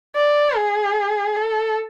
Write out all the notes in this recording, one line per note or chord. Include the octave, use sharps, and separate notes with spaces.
D5
G#4
A4